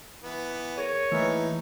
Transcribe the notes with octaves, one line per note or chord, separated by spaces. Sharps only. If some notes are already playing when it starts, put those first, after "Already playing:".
E3 B3
G#4 A#4 C#5
E3 A3 A#3 D#4 E5